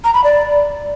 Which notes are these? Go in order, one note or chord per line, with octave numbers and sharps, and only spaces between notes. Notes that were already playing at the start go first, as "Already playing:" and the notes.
A#5
B5
D5